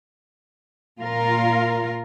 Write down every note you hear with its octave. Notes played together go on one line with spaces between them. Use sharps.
A#2 F4 A#4 F5